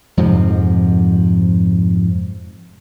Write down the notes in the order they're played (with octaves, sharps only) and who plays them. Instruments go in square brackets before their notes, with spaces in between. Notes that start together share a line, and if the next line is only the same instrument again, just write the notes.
[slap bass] F2 G#2 C3 F3